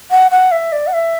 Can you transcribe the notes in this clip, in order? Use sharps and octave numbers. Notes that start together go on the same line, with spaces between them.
F#5
F#5
E5
D5
F#5
E5